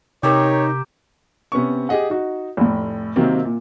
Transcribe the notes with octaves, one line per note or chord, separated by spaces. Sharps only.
C3 D#4 G4 A#4 C#5 E5 A#5
C3 B3 C#4 C#6
G4 G#4 D#5 F#5
D#4 F#4
F1 A2
C3 D#3 F#3 A#3 C4
A#2